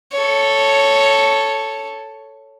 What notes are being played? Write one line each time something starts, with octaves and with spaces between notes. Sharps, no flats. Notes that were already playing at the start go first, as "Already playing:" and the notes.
A4 C#5